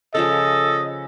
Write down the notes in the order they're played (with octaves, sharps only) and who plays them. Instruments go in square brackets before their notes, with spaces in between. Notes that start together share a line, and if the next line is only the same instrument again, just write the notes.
[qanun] C#3 F3 G#3 [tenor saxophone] A4 [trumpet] D#5